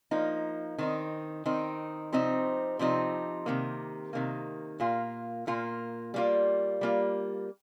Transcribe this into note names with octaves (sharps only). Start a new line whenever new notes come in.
F3 A#3 D#4
D#3 C4 D#4
D#3 C4 D#4
C3 F3 C4 D#4
C3 F3 C4 D#4
C3 D#3 A#3
C3 D#3 A#3
A#2 A#3 F4
A#2 A#3 F4
G3 A#3 F4
G3 A#3 F4